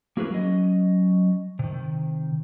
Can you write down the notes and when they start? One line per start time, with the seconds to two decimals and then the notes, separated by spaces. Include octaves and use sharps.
0.17 A#3 E4 F#4 G#4 A#4 B4
0.31 F#3 C#4 D#5
1.59 C3 D#3